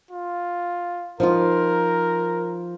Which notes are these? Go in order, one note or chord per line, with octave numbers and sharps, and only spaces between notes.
F4
F3 D#4 F4 A#4